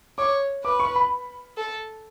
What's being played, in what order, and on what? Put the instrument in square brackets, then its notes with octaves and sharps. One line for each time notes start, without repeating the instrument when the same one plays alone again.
[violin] C#5 [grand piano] D6
[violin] B4 [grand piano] D6
[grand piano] C#6
B5
[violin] A4